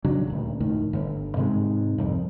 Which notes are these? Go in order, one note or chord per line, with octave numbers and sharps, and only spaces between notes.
C#3 F#3 D4
D#1 D2
F1 D2 A2 D#3
G1
G#2 C3 D#3 G#3
C2 F2